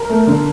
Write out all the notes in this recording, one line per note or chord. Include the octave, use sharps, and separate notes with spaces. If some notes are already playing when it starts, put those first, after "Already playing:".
Already playing: A#4
A3
D3